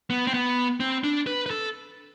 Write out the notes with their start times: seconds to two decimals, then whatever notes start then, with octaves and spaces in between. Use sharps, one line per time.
0.10 B3
0.27 C4
0.34 B3
0.80 C4
1.04 D4
1.27 B4
1.46 B4
1.50 A4